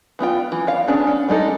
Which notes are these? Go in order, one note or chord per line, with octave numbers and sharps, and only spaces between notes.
E3 B3 F4 G5
E3
C#5 F5
B3 C#4 D4 G#4
C#4
G3 G#3 D#4 A4